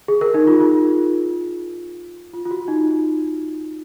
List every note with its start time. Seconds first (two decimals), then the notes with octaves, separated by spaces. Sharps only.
0.08 G#4
0.21 A#4
0.34 D#4
0.47 F4
0.60 F4
2.33 F4
2.45 F4
2.51 F#4
2.68 D#4